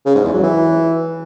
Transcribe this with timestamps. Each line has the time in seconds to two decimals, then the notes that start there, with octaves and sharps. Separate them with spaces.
0.06 C#3
0.15 G#2
0.24 E2
0.34 F#3
0.43 E3